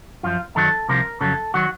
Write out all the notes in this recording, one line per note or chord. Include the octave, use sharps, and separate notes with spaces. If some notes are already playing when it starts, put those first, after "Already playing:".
F#2 F3 F4
F#2 D#3 F#3 A4
C2 C3 F3 A#4
F2 C#3 F#3 A4
D#3 F#3 F#4